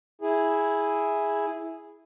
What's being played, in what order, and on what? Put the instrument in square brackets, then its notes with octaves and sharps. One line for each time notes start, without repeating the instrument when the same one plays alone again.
[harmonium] E4 G#4